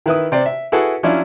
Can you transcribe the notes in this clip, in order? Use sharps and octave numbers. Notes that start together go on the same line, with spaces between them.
D#3 E4 B4 E5 D#6
C3 C5 D5
E5
E4 F#4 G#4 A4 B4 F#5
F3 F#3 C#4 D4 E4